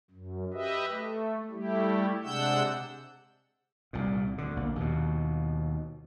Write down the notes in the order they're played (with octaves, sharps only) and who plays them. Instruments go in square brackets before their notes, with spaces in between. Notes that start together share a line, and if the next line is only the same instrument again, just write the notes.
[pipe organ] F#2
G4 B4 D#5 E5
A3
G3 A3 E4 G4
C3 G#3 D4 F#5 E6 G6
[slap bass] C2 A#2
D2 D3
A#1 A#3
D#2 B2